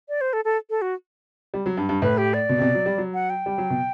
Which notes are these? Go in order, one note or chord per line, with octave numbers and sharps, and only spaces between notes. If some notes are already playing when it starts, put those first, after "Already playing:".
D5
C5
A4
A4
A4
F#4
G3
F#3
G2
G2
A2 B4
G4
D5
B2
C3
B2
F#3
G3
F#3
F#5
G5
G3
F#3
B2